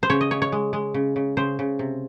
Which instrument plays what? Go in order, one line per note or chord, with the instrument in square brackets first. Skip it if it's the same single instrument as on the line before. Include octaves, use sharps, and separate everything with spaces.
[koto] C5
C#3 C#5
D#5
C#3 C#5
C#5
G#3
G#3
C#3
C#3
C#3 C5
C#3
C3